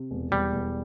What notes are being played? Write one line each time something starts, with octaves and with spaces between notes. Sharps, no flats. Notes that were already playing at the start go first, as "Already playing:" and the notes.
Already playing: C3
E1
E1 G3
E1